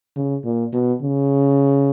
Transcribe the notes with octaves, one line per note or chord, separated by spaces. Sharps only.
C#3
A#2
B2
C#3